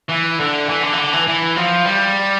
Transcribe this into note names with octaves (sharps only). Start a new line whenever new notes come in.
E3
D3
E3
D3
E3
D3
E3
E3
F3
G3